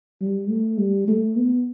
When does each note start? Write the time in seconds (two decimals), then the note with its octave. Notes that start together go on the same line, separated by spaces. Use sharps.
0.21 G3
0.49 A3
0.78 G3
1.08 A3
1.37 B3